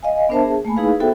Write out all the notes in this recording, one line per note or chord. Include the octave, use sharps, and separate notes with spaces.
D#5 F5 G#5
B3 D4 A#4 C5 E5 A5
G#4
A3 A#3 G#5 B5
D#4 E4 G#4 B4 F5
B3 F#4 A4 C5 E5 G5